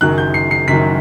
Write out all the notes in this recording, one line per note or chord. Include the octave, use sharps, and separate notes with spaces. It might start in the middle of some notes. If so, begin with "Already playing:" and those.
F#1 F#2 D#3 F#3 F#6
G6
C7
C7
F#1 F#2 D#3 F#3 B6